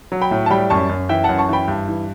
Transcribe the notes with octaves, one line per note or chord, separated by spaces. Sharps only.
F#3
G5 B5
A2
A5
G3 G5 B5
F#2 A5 C#6
F#2
E3 E5 G5
F#2 F#5 A5
A5 C#6
E3 G5 B5
G2
E3